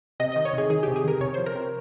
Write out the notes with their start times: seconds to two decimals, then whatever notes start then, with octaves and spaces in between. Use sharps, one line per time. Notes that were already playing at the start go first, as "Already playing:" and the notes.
0.20 C3 D#5
0.32 D#3 D#5
0.45 C#5
0.53 C3 G#4
0.70 D#3 G#4
0.83 C3 G4
0.96 G#4
1.04 D#3 A#4
1.20 C3 C#5
1.34 F3 C5
1.46 A#4
1.55 C3